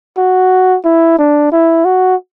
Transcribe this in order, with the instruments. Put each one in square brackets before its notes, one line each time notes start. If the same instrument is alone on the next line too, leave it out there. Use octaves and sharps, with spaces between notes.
[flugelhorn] F#4
E4
D4
E4
F#4